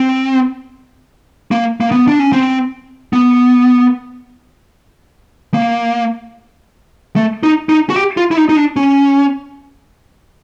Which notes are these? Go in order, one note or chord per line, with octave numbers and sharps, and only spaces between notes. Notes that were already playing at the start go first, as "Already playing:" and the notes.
Already playing: C4
A#3
A#3
B3
D4
C#4
C4
B3
A#3
A3
D#4
D#4
F#4
G4
F4
E4
D#4
D#4
D4
C#4